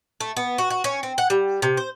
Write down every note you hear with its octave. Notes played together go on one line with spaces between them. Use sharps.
A3
B3
F#4
F#4
C#4
C4
F#5
G3
C3
C5